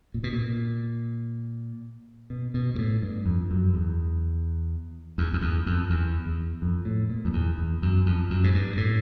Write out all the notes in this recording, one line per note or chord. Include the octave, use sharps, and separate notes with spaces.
A#2
B2
A#2
B2
B2
G#2
A2
G2
F2
F#2
E2
E2
F2
E2
F2
E2
E2
F2
A2
A#2
F2
E2
E2
F#2
F2
F#2
G#2
G2
A2